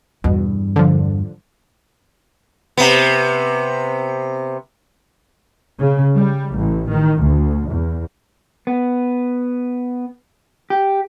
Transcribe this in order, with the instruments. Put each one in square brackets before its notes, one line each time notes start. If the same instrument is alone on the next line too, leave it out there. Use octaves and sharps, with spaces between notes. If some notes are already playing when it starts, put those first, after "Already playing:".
[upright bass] E2 G2 [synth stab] B2
[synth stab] D3 F3
[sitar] C3 B3
[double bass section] C#3
G3
A1
D#3
D2
E2
[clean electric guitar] B3
G4